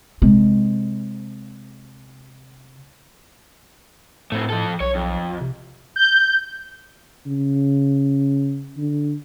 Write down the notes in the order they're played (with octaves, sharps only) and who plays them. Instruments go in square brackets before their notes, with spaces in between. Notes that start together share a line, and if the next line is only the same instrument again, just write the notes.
[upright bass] C3 G#3
[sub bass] A2 [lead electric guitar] A3 C4
[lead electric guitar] F3 A4
[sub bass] B1 [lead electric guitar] C#5
[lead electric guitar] F2
[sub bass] C3
[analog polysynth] G6
[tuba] C#3
D3